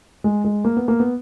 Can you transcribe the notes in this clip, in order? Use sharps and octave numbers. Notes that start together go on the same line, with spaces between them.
G#3
G#3
A#3
B3
A#3
B3